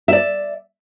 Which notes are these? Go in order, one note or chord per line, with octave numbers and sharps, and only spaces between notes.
D5 E5